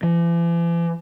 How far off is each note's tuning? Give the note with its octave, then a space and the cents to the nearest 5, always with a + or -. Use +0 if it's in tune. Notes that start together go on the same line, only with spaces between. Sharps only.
E3 +45